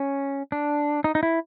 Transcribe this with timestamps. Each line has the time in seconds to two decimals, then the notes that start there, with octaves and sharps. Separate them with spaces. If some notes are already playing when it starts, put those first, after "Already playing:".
Already playing: C#4
0.52 D4
1.04 D#4
1.15 D#4
1.23 E4